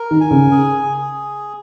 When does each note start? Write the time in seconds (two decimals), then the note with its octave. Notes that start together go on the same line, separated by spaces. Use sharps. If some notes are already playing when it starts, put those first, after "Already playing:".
Already playing: A#4
0.11 D#3
0.21 G#5
0.31 C#3
0.51 G#4
0.82 G#4